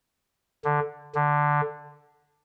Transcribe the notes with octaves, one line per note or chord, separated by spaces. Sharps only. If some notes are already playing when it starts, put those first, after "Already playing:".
D3
D3